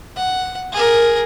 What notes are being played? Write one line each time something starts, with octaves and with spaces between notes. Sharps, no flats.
F#5
G#4 A#4